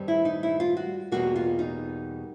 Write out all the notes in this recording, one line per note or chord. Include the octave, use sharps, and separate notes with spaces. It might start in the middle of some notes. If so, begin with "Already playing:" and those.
Already playing: G2 D#3 G3 C4
E4
D#4
E4
F4
F#4
E2 B2 G3 A#3 F#4
F4
D#4